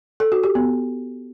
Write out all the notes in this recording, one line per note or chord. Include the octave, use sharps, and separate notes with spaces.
A4
F#4
G4
B3